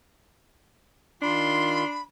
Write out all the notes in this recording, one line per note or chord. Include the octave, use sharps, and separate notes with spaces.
D#3 D4 F4 B5 C6